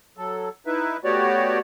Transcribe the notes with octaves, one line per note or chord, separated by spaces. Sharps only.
F#3 A4
D#4 E4 B4 E5
A3 B3 F#4 G4 C#5 D5